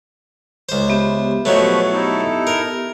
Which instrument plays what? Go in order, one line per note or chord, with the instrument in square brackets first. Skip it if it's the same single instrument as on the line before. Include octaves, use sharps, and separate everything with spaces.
[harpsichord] C#2 C5
[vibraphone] B3 G4 E5
[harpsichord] B2 F#3 A3 [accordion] F3 B4 C#5
[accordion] D#4 E4 A4
[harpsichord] A#4